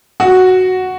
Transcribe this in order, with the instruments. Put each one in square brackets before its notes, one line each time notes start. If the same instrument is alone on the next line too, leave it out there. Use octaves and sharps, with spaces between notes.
[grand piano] F#4